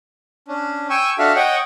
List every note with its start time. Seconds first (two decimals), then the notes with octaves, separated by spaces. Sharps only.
0.48 C#4 D4
0.90 G5 G#5 C#6 E6
1.19 D4 F#4 A4 E5 F5
1.36 C#5 D#5 F#5 G5